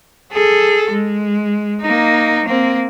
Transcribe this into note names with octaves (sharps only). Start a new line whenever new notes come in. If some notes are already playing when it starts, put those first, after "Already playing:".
G#4 A4
G#3
A#3 D#4
A#3 C4